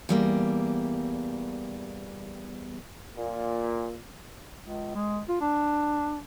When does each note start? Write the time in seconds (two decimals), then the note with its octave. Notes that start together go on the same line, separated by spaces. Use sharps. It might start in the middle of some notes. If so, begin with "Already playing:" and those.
0.09 E2 G3 A#3
3.15 A#2
4.61 C#2
4.95 G#3
5.28 F4
5.41 D4